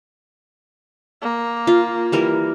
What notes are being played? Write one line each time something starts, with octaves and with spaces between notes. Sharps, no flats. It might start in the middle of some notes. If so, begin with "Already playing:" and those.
A#3
F4
E3 G3 A#4